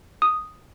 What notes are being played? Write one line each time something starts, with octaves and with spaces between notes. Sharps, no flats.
D#6